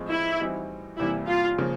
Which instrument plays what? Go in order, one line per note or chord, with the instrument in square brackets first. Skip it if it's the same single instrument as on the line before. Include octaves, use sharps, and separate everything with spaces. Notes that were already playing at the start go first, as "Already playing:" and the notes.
Already playing: [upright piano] A2 F3 G#3 C4
[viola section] E4
[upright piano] E3 G3 C4 D#4 F#4
[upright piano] E2 C3 E3 G3 A#3 [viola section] E4
[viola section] F4
[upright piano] C#3 F3 A#3